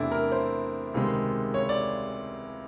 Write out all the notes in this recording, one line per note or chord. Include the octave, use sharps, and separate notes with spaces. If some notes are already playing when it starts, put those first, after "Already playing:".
Already playing: E2 C3 E3 A3 D4 E4
A#4
C5
C#2 C3 D#3 G#3
C#5
D5